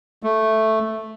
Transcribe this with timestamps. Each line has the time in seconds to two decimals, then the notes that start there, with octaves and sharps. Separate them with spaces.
0.23 A3